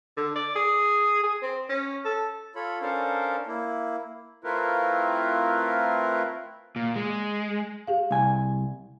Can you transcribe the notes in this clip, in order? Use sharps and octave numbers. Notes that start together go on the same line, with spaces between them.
D3
D5
G#4
G#4
C4
C#4
A4
F4 A4 C#5 B5
C#4 D4 A4 A#4 C5 F5
A#3 E4
A3 C4 E4 F4 A#4 B4
A#2
G#3
G4 G#4 F5
C2 G#5